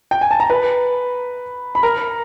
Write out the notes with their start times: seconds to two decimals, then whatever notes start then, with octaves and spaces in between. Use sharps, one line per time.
0.11 G5
0.21 G#5
0.31 A5
0.40 A#5
0.50 B4 B5
1.75 B5
1.83 A#4 A#5